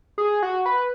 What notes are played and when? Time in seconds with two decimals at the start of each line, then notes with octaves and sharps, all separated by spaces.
0.18 G#4
0.42 F#4
0.66 B4